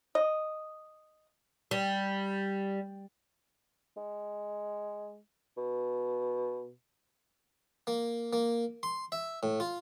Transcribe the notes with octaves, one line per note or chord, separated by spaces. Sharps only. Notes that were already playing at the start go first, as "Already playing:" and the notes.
D#5
G3
G#3
B2
A#3
A#3
C6
E5
A2
F4